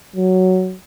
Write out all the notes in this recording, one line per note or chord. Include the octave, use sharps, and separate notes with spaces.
F#3